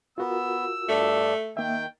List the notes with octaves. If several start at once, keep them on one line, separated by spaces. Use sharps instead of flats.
B3 F4 F#4 A#4 E6
G2 A3 D4
D#3 A#3 E5 G5